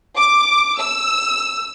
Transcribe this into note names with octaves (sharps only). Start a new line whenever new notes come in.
D6
E6